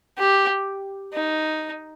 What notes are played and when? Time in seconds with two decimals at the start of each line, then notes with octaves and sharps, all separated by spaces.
0.19 G4
1.14 D#4